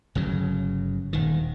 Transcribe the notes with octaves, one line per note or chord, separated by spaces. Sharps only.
G1 C#3 F#3
D#1 D#3